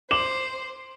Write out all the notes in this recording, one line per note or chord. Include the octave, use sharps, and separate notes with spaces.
C5 D6 E7 F#7